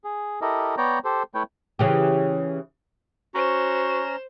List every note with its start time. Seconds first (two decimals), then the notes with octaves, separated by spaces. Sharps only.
0.04 G#4
0.41 E4 G4 A4 A#4 D#5
0.77 B3 C#5 D5 G5 A#5
1.05 G4 A4 C5
1.35 A3 E4 B4 C#5 G5
1.79 C#3 E3 G4
3.35 C#4 F#4 C5 A#5 E7